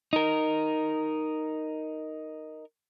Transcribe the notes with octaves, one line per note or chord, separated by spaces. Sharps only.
D#4 A#4